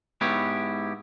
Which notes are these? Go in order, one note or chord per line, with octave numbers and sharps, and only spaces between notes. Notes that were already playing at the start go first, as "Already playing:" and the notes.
G#2 B3 E4 G4 C#5